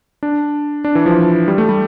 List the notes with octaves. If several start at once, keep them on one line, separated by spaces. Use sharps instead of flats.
D4
D4
E3
F3
G3
A3
G3